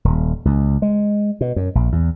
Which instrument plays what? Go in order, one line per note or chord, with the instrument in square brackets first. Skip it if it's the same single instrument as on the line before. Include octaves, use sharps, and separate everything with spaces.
[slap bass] D#1
C#2
G#3
B2
F#2
A#1
E2